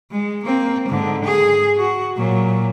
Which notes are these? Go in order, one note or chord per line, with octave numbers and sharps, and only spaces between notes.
G#3
A#3 C4
G#2 D3
G#4
F#4
A#2 F#3